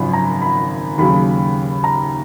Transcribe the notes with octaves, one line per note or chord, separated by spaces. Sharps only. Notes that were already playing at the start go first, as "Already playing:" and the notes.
Already playing: G#1 F#2 C#3 F3 B5
A#5
B5
D#2 C#3 F#3 B5
A#5